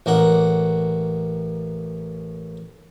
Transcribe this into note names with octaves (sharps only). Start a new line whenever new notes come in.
A1 A#3 F#5